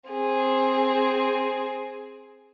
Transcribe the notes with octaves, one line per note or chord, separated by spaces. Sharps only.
C4 G#4